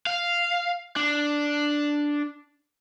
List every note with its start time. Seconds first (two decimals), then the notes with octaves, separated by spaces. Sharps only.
0.07 F5
0.96 D4